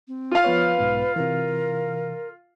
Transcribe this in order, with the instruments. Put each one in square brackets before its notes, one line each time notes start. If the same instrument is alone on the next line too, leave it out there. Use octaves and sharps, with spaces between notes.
[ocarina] C4
[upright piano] F4 F5
[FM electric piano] F3 B3 C#5 [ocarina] B4
[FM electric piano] B1 G#2 B3
[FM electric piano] C3 E3 [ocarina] A#4